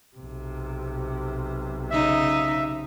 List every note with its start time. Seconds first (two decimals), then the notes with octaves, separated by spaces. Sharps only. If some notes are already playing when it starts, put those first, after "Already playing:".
0.16 B1 C3
1.91 C#3 D#4 E5